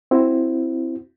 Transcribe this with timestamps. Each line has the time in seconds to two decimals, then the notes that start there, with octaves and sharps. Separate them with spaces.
0.11 C4 E4 F#4